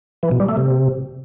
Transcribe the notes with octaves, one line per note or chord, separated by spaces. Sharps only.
E3
B2
G3
A3
C3